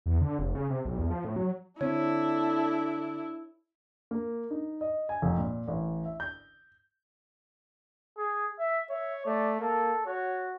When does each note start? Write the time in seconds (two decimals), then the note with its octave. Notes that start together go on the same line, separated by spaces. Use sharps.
0.06 E2
0.21 D3
0.39 F1
0.55 C#3
0.70 C3
0.85 B1
0.98 E2
1.10 F3
1.25 A2
1.36 F#3
1.81 D3 C4 D4 E4 A4 C#5
4.11 A#3
4.51 D#4
4.81 D#5
5.09 G#5
5.22 F1
5.38 A#2
5.68 A1
6.05 E5
6.20 G6
8.18 G#4
8.59 E5
8.90 C#5 E5
9.26 A3 D5
9.60 A#3 A4
10.06 F#4 C#5